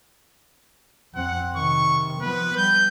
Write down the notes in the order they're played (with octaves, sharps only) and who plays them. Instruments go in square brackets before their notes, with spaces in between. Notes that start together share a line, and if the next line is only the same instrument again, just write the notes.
[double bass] F2 C4 [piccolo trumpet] F#5
[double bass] C3 D#3 [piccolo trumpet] C#6
[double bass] F3 B3 [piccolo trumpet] B4
[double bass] G3 [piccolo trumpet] G6